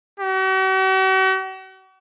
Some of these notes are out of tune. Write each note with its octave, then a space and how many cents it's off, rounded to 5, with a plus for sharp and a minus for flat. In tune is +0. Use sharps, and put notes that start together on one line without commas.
F#4 +45